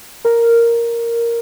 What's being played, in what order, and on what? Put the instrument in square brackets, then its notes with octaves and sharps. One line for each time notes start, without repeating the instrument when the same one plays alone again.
[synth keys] A#4